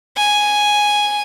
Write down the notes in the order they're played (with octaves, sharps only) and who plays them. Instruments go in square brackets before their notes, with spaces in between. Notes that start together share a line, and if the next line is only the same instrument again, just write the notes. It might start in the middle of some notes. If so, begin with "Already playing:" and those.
[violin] G#5